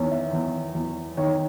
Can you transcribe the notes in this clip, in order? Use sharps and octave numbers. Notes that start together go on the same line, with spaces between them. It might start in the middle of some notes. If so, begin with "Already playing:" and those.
Already playing: E2 D#3 C#5
E5
E2
E2
D#3 C#5